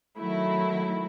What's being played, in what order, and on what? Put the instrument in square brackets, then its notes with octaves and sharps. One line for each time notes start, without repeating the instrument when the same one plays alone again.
[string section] D#3 F#3 A3 E4